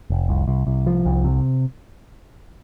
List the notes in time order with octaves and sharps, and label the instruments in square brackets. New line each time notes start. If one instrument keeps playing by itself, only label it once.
[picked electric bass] F1
C2
C2
C2
F3
C2
C3